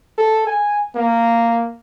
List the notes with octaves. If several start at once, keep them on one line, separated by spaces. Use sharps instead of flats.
A4
G#5
A#3